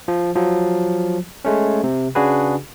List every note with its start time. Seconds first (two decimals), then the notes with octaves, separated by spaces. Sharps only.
0.08 F3
0.35 F3 F#3
1.45 G#3 A3 C#4
1.84 C3
2.15 C#3 D4 F#4 G#4 B4